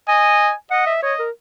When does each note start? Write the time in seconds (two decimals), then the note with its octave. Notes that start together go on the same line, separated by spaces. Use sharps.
0.08 D#5 G#5
0.71 D#5 F#5
0.87 E5
1.03 C#5 D#5
1.19 A#4